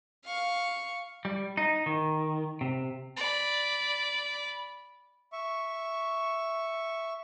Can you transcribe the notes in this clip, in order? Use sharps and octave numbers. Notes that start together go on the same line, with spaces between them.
F5 C#6
G3
D#4
D#3
C3
D5 B5
E5 C#6